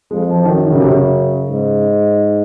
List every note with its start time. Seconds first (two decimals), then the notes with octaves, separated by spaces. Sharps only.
0.11 F2 G#3
0.29 F3
0.40 F3
0.45 F#2 D#3
0.63 D#3
0.71 C#3
0.80 C3
0.90 C#3
1.50 G#2